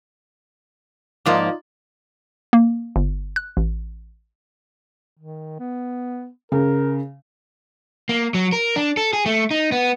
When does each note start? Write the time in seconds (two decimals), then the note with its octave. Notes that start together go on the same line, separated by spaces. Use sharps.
1.26 G#2 F3 A#3 D#4 F4 D5
2.53 A#3
2.96 G1
3.36 F#6
3.57 A1
5.17 D#3
5.60 B3
6.52 C#3 A#4
8.09 A#3
8.34 F#3
8.53 A#4
8.76 D4
8.97 A4
9.13 G#4
9.26 A3
9.51 D#4
9.72 B3